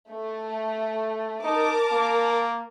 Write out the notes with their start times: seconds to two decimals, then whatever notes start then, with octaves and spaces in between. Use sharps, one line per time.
0.11 A3
1.44 D#4 A#4 A5 D6
1.91 A#3